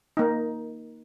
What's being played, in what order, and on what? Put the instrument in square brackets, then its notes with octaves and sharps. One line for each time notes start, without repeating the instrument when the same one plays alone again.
[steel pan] A#3 D#4